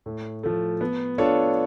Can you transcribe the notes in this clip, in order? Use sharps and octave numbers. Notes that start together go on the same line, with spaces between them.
A2
F3 A3
B3
D4 F4 A4 C#5